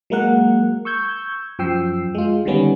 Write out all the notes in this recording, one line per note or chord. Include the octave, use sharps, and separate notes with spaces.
F#3 G#3 A#3 A#4 F#5
C#6 E6 G6 G#6
F#2 F3 G5 E6 C7
G#3 F4
D3 D#3 G3 B3 C#4